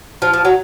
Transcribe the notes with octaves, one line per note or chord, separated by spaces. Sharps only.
F3
F3
F#3